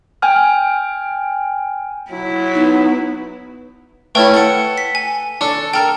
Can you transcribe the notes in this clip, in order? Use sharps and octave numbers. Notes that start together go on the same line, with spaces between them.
G5 G#5 F6
F#3 E4
B3 D#4
A3 C#4 E4 B4 G5
A4 F#5
B6
G#5
D4 A4 C#6
A4 A#4 G5